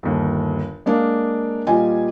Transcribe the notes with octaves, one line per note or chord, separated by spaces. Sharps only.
G1 D#2
G#3 A#3 D4 F5
A#2 G3 F4 D#5 G#5